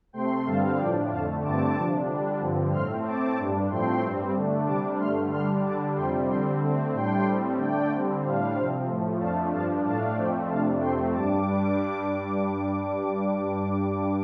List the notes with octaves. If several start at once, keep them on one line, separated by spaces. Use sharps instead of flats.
C3 A3 C4 G5 C6
G2 D3 G3 C4 F5 A5
A2 F3 D4 D5 G5
F2 D3 A3 F5 A5
G2 D3 A3 C4 A5 D6
C3 F3 D4
D3 G3 D4
G2 D3 F3 C4
A2 A3 C4 C6 F6
A2 A3 C4 A5 D6
G2 G3 D4
A2 F3 A3 C4 G5 C6
G2 G3 C4
D3 A3 D4
C3 G3 D4 A5 D6
G2 D3 A3 C6 F6
D3 G3 D4 C6 F6
D3 G3 D4 A5 D6
F2 C3 G3 C4 G5 C6
D3 G3 C4 G5 C6
D3 A3 C4
A2 G3 D4 G5 C6
A2 G3 C4
D3 A3 D4 D5 G5
D3 G3 C4
A2 G3 D4 C5 F5
C3 F3 C4 C5 F5
A2 F3 A3
F2 F3 A3 D4 F5 A5
G2 F3 D4 F5 A5
A2 A3 D4 F5 A5
F2 F3 A3 C4 D5 G5
F2 C3 A3 D4 F5 A5
F2 C3 A3 C4 G5 C6
G2 G3 D4 A5 D6